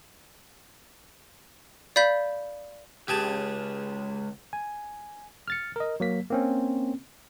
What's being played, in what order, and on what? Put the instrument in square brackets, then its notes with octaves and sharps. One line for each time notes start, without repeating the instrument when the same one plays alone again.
[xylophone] D5 F5 B5 G6 B6
[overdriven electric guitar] C#2 [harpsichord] G4 G#4 A5
[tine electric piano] G#5
F6 A6 C#7
A#4 D#5
F#3 A#3 B6
A#3 C4 C#4